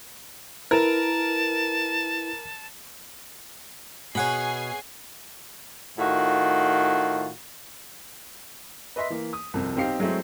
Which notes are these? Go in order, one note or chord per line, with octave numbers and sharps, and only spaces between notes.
E4 A#4 B4 A5
B2 G#4 C#5 F#5 G#5 B5 C7
A2 D#3 F4 F#4
B4 D#5 E5 C6 B6
E3 A#3
D#6
C2 F2 C3
B1 C4 D#4 G4 F5 C7
F#3 G#3 A3 C4 E4